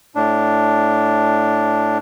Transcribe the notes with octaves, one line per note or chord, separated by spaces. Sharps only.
A2 D4